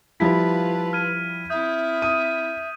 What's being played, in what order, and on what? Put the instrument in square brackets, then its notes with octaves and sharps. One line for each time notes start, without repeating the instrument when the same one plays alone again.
[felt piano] F3 G3 E4 [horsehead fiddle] F4 B4 [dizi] A5 [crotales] B6
[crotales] F6 G#6 D#7
[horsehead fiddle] C4 E4 [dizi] E5 [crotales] D#6 G6
[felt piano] D#6 [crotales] D#7